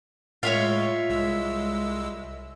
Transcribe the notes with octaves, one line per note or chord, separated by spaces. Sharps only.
A2 G#3 F4 C#5 E5 F5
C2 G#3 E6